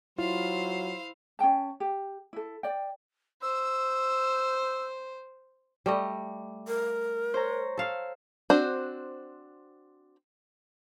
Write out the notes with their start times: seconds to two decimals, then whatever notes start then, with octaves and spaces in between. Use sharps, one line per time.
0.18 F#3 E4 F4 C5 F5
1.39 C#4 G#4 G5 A5
1.80 G4
2.33 E4 A4
2.63 D5 G5
3.42 C5 E6
5.86 G3 A3 D#5
6.67 A#4
7.34 C5 C#5 A#5
7.77 A4 F5
8.50 C4 D4 F#4 C5